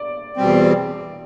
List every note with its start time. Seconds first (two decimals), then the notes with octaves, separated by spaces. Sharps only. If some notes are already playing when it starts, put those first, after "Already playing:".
Already playing: D5
0.37 E2 B2 G3 C4